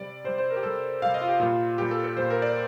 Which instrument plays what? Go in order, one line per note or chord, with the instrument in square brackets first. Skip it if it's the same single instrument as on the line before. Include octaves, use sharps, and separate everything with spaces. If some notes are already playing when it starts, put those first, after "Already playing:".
Already playing: [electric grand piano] C3 G3 D5
C3 G3 C5
C5
A#4
G4
C3 G3 A4
C3 G3 F5
D#5
F4
G4
A#2 G3 F4
A#2 G3 G4
A4
A4
A#2 G3 C5
A#4
D5